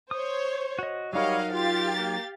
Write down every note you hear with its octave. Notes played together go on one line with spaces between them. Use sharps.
C5 C#5 D#6
F#4 D#5
F#3 G3 D#4 A#4 C#5 D#5 F5 F#5
F4 G4 F5 A6
A#3